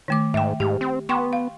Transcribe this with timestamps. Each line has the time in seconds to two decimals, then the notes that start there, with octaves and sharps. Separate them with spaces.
0.08 D#3 A3 D6
0.34 G#2 E5 G5
0.60 G#2 G4
0.81 C4
1.09 B3 G5 C6 C#6
1.33 F5